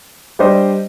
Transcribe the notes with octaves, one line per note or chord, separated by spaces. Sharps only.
G3 D4 G4 C5 D#5